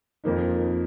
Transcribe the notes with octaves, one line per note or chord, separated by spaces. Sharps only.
F2 F3 A#3 D#4